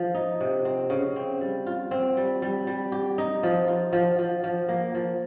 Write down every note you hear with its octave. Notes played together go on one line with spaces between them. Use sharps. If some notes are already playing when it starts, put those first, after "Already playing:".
Already playing: F3
D#4
C3
C4
C#3
C4
G3
F4
C4
G3
G3
G3
G4
D#4
F3
F4
F3
F3
F3
A#3
F3